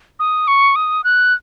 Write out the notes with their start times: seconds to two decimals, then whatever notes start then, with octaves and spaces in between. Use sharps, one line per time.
0.19 D#6
0.47 C#6
0.75 D#6
1.04 F#6